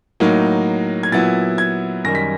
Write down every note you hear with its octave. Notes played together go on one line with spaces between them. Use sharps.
A2 F#3 A#3 D#4
G#6
A#2 F#3 B3 E4 A6
G#6
F#2 D#3 G3 A#6
B6